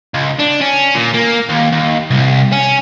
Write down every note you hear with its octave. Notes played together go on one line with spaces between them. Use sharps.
C#2
D4
C#4
A#2
A#3
D#2
D#2
C2
C#4